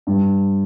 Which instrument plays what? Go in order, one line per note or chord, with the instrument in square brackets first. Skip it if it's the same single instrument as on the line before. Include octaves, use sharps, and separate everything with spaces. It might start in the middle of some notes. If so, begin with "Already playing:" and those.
[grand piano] G2